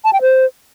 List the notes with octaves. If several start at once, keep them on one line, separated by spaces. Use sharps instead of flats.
A5
G5
C5